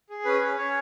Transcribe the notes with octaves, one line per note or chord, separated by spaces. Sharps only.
G#4
C#4 B4
C#4
C#4 C#5